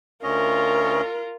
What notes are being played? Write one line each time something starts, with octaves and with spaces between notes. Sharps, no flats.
D2 C#4 F4 A#4 D#5